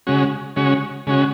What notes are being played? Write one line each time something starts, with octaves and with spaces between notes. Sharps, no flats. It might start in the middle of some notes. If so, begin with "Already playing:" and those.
C#3 G#3 C#4 F#4
C#3 G#3 C#4 F#4
C#3 G#3 C#4 F#4